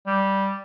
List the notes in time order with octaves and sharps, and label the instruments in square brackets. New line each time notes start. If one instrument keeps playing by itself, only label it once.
[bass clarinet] G3